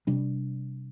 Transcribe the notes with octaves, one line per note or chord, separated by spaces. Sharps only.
C3 G3 D4